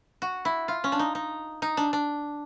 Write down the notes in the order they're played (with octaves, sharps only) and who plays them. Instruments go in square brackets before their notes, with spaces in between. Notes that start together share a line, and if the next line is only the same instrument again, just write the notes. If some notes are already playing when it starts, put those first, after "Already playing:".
[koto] F#4
E4
F4
C#4
D4
D#4
D#4
D#4
D4
D4